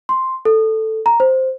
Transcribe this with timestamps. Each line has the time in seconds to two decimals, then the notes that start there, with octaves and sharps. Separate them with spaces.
0.09 C6
0.45 A4
1.06 A#5
1.20 C5